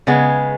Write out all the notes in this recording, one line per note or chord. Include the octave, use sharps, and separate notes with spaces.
C#3 G#3 B3